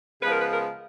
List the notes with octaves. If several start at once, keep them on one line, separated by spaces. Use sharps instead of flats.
C#3 F3 G#3 B3 B4
A#4
B4
A#4